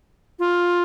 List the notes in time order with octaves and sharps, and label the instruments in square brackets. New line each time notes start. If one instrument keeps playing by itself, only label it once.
[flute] F4